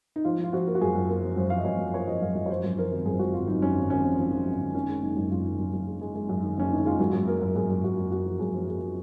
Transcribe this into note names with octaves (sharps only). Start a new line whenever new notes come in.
D#4
F3 F4
F3
F4
F3 F#4
A#3
F#4
F#2 G#4
F#2
A#3 A#4
F3
F#2 C5
F3 F5
D#5
F#2 C#5
F#2
A#3 C#5
F3 D#5
F#2 F5
F#2 D#5
C#5
F3 C5
F#2
F3 A#4
G#1
F#2 G#4
F#2 F#4
G#1 F4
F#2 D#4
F#2 C#4
G#1
G#1 C#4
F3
F3
F3
G#1
G#1
D#3 C#4
G#3
F#1 D#4
F#2
F#2 F4
D#3
F#2
F#2
G#3
G#3
G#3
F#2
D#3
F#1 C#4
D#3 D#4
G#3 F4
F#2 F#4
F#2
A#3 A#4
F#2
F#2 G#4
F#2
F#2 F#4
F#2
F#2 F#4
F3
F#2 G#4
F3
A#3 G#4